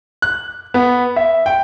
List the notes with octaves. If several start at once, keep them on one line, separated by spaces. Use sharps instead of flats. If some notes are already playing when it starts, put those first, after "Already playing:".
F#6
B3
E5
G5